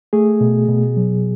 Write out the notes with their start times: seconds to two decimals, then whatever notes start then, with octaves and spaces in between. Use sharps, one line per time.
0.13 A3 G#4
0.41 B2
0.68 B2
0.97 F#3